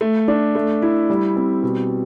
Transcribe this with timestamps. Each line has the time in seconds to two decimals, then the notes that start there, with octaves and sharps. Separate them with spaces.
0.01 A3
0.28 D4
0.55 A3
0.82 E4
1.10 G3
1.36 C4
1.63 B2